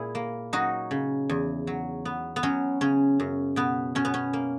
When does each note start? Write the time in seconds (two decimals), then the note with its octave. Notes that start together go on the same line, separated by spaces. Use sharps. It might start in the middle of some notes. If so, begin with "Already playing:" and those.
Already playing: A#2 E4 G#4
0.15 A#3
0.53 F#3 D#4 F#4
0.91 C#3
1.30 E2
1.67 F#3
2.05 B3
2.36 B3
2.43 F#3 C#4
2.81 C#3 C#4
3.20 F#2
3.56 B2 B3
3.95 B2 C#4
4.05 B3
4.14 C#4
4.33 A#3